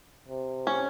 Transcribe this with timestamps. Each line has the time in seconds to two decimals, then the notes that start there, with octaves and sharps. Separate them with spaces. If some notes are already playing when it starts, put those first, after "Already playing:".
0.28 C3
0.67 C#4